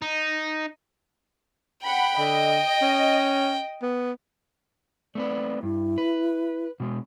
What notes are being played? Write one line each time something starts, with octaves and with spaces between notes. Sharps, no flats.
D#4
F#5 G5 B5
D3 D#5
C#4
B3
A3 C4 B4 D5
G2 E4
B4
B2 G#3